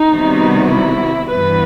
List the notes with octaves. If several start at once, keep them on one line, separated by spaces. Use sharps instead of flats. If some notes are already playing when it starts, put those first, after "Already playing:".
Already playing: D#4
C3 D#3 G3 B3 F#4
E4
G2 E3 B3 B4